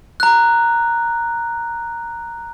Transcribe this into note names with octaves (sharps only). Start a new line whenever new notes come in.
A#5 F#6